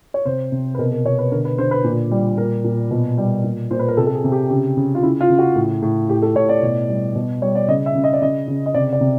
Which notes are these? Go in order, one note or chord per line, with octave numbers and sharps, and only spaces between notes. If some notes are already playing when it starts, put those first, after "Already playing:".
C#5
C3 C5
C3
B4
B2 A#4
A#4
B2 C#5
B4
D3 A#4
B4
D3 C5
B4
A#2
G3
A#2 A#4
A#2
B2
G3
A#2
A#2 C5
B4
A#4
C3 A4
A4
G#4
C3
G4
C#3 G4
C#3
F4
C#3 E4
F4
C#3
F#4
A2
A2
A2 G4
A4
A2 C#5
D5
B2
G3
B2
G3 C#5
D5
C#3 D#5
E5
C#3
D#5
D5
C#3 D#5
C#3
D#5
C3 D5
D5
C3